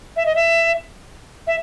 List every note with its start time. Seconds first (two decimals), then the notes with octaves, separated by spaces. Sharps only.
0.16 E5
0.26 D#5
0.35 E5
1.47 E5